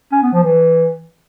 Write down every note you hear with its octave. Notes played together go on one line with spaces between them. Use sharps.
C#4
B3
F3
E3